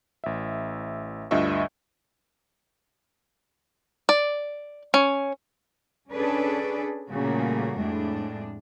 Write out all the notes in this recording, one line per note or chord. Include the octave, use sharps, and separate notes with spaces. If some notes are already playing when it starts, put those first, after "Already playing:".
A1 E5
D2 G2 F4 D#5 E5 C#6
D5
C#4
C#4 D4 G#4 A4 B4 D5
A#2 C#3 G3 A3 A#3 F#4
F2 A2 G#3 D4